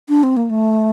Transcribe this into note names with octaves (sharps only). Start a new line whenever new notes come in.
D4
C4
A#3
A3